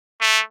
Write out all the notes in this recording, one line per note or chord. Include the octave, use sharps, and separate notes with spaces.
A3